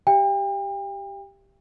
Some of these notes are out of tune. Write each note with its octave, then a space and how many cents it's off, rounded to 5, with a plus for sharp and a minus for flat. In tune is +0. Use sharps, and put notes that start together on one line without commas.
G4 +0 E5 +35 G5 +35